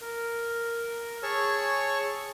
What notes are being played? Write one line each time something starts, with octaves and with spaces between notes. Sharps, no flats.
A#4
G#4 C#5 A5 C#6 E6